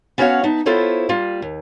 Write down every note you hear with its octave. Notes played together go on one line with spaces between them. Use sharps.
B3 C#4 F#4 C#5 F5 F#5
B3 D#4 E5 A5
B3 E4 F4 A4 C5 C#5
G3 A#3 F4
D#2